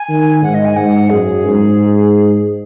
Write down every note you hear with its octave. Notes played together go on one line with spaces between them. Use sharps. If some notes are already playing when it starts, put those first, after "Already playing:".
Already playing: G#5
D#3
G#2 F#5
D#5
G#5
G#2 F#5
F#2 G#4
G#2